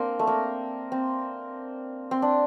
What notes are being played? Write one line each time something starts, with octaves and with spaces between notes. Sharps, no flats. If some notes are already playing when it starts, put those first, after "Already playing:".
Already playing: A#3 C4 D4
A3
A#3
C4
C4
D4